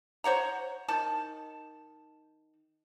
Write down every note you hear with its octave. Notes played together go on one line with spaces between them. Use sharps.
C5 C#5 F#5 A#5
D#3 A5